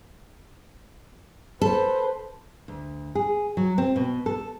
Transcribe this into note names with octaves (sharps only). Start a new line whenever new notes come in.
A4 B4 C5
D2
G#4
F#3
C4
B2
A4